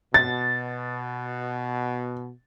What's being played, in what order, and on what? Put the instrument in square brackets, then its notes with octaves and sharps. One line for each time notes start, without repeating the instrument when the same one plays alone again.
[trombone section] B2 [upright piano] A6